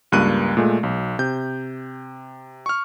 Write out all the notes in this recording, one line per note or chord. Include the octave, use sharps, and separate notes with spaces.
C#2 G2 A#3 F#6 D#7
A#2 G#3 A3
B1
C3 G6
C#6 F6